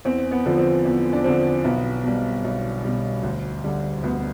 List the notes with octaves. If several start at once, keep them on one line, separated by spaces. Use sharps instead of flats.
E2 C4
B3
D3 F3
C4
E2
D4
D3 F3 C4
B1 B3
B2 G3
B1
B2 G3
D2
D3 G3
D2 B3
B3